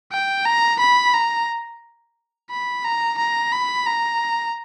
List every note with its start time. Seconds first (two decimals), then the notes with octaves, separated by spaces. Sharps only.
0.12 G5
0.45 A#5
0.80 B5
1.14 A#5
2.50 B5
2.84 A#5
3.18 A#5
3.52 B5
3.86 A#5